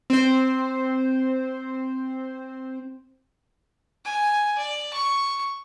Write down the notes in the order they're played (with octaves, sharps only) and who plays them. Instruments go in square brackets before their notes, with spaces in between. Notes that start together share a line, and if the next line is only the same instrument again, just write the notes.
[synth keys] C4 C5
[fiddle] G#5
D5
C#6